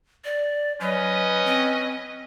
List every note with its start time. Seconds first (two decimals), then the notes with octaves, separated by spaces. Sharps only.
0.25 D5
0.80 F#3 C#4 B4 D#5
1.46 C4